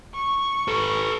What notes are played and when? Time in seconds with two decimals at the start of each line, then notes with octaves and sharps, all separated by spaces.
0.14 C#6
0.68 A4 B4